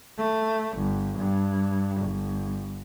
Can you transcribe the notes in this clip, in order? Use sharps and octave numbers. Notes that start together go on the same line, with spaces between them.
A3
G1
G2
G1